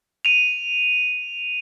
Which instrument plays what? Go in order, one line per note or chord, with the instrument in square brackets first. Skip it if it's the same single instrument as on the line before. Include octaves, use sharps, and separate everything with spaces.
[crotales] D#7 F7